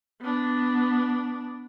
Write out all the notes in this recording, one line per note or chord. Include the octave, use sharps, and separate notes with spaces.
B3 D4